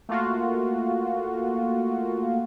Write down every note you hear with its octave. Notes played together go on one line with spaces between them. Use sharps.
A3 A#3 F4 F#4